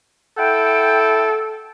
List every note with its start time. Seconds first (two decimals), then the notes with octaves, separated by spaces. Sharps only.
0.37 E4 A4 F#5 G5